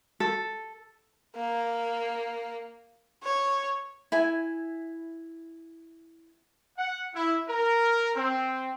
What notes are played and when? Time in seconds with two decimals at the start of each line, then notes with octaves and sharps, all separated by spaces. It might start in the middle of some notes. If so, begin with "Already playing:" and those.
0.20 A4
1.35 A#3
3.23 C#5
4.12 E4 G#5
6.77 F#5
7.15 E4
7.48 A#4
8.15 C4